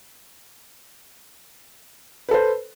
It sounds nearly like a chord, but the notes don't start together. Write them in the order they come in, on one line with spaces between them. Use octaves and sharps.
B4 A4 C5